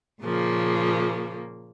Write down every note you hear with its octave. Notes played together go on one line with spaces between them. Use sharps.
A#2 C#3 F3 A#3